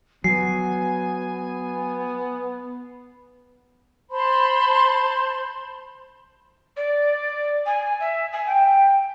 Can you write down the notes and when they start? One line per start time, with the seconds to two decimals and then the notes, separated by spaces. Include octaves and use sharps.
0.24 F#3 B3 G#5 C7
4.10 C5 A5 B5 C6
6.76 D5
7.65 G#5
7.99 E5
8.32 G#5
8.46 G5